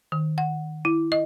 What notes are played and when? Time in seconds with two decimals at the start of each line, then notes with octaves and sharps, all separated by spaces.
0.12 D#3
0.38 F#5
0.85 E4
1.12 D#5